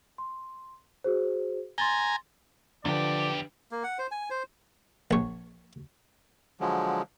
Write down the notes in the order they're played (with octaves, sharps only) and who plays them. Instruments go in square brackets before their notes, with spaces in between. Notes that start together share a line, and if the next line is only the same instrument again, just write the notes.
[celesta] C6
F#4 G#4 C5
[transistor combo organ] G#5 A#5 [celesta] C6 A6 G7
[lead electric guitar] E2 G4 [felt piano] D3 F3 [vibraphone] D4 B4 [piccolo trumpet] D5
[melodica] A#3
F#5
C5
G#5
C5
[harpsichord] A#1 C#5
[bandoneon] D3 F3 F#3 G#3